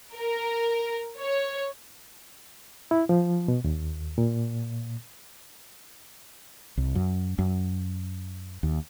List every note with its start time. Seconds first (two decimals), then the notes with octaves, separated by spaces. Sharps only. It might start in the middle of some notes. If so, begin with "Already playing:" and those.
0.16 A#4
1.18 C#5
2.91 E4
3.09 F3
3.48 B2
3.64 D#2
4.18 A#2
6.77 C2
6.95 F#2
7.39 F#2
8.63 D#2